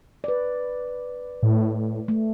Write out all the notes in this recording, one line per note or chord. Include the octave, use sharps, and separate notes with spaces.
B4 D5
A2
A3